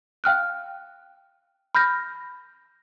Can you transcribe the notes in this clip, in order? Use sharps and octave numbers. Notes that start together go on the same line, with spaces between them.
F5 G5 F6 F#6
B5 F6 G6 A#6